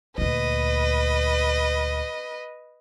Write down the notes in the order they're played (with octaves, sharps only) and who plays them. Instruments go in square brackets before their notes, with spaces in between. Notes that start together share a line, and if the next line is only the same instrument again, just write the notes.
[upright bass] D2 A#2 [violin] B4 D#5